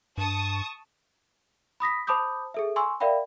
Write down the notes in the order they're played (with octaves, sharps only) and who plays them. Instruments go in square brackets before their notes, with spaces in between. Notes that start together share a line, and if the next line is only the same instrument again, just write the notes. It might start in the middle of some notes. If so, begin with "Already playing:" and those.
[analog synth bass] G2 [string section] A5 C#6 D#6
[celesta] B5 D#6 A#6 B6
C5 A5 B5 D6 D#6 G6
G#4 A4 E5
G#5 C6 C#6 E6
A#4 D5 E5 F5 G5 B5